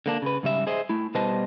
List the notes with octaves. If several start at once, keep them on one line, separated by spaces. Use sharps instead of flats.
D3 A#3 D4
C#3 B4
G#2 C#3 G3 E5
G#4 C5 D#5 E5
A3 E4
B2 G3 B4 C5 D#5 A5